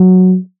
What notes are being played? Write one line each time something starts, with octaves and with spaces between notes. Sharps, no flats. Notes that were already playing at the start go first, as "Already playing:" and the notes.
Already playing: F#3